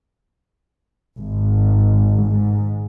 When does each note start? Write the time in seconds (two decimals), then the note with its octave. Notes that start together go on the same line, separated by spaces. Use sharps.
1.19 G#1
2.24 G#2